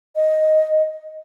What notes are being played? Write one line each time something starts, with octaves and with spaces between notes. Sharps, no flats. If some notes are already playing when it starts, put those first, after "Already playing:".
D#5